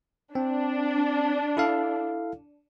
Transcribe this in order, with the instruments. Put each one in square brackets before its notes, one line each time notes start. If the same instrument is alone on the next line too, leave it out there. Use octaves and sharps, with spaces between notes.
[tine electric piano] C4 [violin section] D4
[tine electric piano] E4 A4 F5